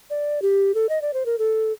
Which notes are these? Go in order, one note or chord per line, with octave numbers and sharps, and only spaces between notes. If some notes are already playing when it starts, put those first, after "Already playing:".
D5
G4
A4
D#5
D5
C5
A#4
A4